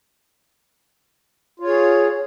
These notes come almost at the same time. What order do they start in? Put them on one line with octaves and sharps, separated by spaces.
F4 C#5 G#4